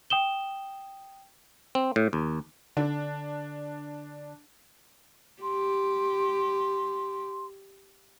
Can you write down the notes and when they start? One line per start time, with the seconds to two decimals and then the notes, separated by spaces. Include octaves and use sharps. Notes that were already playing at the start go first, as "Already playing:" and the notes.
0.10 G5 D#6 E7 G7
1.75 C4
1.96 A2
2.13 D#2
2.77 D3 D4
5.42 G4 C6